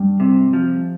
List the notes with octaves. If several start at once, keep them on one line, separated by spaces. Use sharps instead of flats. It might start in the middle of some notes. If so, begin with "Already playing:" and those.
Already playing: G2
C3
F3